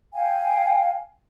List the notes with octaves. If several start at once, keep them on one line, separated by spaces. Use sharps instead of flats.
F5 G5 G#5